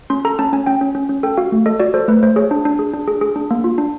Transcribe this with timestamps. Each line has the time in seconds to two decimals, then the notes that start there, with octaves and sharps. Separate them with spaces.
0.10 C#4 C6
0.25 A4 A#5
0.39 C#4 A5
0.53 C#4 G#5
0.66 C#4 G5
0.81 C#4
0.95 C#4
1.09 C#4
1.23 A4 G5
1.38 F#4 F5
1.52 A3
1.66 A4 D#5
1.80 F#4 D5
1.94 A4 C5
2.08 A3 B4
2.22 A3 C5
2.36 G#4 C#5
2.51 D4
2.65 D4
2.79 G#4
2.94 D4
3.08 G#4
3.21 G#4
3.36 D4
3.51 A#3
3.64 F4
3.78 D4